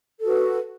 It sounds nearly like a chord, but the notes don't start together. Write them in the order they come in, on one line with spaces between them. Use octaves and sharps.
A4 F#4 B4